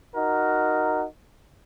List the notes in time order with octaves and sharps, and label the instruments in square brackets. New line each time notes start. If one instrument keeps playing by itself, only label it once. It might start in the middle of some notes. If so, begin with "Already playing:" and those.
[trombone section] D#4 F#4 A#4